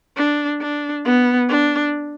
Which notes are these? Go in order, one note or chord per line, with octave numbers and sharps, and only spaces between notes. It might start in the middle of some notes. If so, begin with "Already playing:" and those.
D4
D4
B3
D4